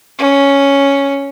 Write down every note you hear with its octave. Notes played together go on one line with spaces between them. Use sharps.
C#4